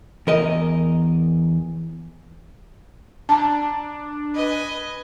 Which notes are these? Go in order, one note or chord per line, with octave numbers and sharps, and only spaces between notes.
E2 A#4 D#5
D4 A5 A#5
B4 D#5 G#5